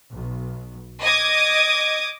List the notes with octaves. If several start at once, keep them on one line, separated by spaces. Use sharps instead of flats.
B1
D#5 D6 D#6 G#6